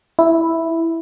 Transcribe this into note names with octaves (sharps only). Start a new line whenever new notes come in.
E4